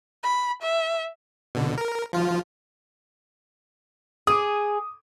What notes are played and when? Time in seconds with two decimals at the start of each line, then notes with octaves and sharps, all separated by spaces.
0.23 B5
0.62 E5
1.55 B2 D3
1.78 A#4
2.13 F3 F4
4.27 G#4 D6 D#6